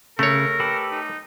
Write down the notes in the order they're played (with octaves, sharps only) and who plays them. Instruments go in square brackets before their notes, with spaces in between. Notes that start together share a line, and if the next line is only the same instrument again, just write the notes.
[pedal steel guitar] C#3 [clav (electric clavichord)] A3 C#5 [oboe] A#4
[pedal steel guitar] G4 A4 B4
[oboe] D#4